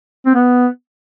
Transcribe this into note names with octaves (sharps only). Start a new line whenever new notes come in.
C4
B3